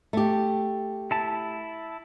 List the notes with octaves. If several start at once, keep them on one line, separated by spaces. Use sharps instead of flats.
A3 G4
E4 A5